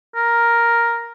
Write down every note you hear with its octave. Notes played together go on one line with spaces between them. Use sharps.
A#4